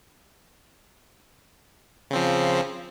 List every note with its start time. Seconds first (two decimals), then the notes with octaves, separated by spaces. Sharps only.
2.11 C#3
2.13 C4
2.16 F3